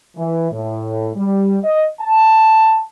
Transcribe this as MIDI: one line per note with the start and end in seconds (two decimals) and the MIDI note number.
0.17 0.51 52
0.52 1.10 45
1.16 1.58 55
1.64 1.86 75
2.01 2.81 81